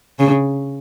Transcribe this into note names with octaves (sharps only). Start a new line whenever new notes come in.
C#3